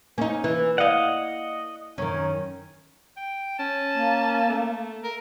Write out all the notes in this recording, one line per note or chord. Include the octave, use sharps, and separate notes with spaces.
A#3 C#4 D#4
E3
D5 D#5 F5 F#5
F#2 D#3 C#4
G5
C#4 A5
A#3
A3
A#4